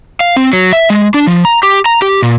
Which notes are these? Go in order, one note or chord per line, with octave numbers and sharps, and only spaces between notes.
F5
C4
F#3
E5
G#3
D4
F3
A#5
G4
A#5
G4
A#2